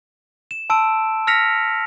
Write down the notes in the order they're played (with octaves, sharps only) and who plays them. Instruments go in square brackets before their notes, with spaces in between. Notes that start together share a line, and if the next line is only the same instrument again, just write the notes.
[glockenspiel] E7
A5 C6 E6 D7 E7
E6 F6 A#6 B6 C#7 F7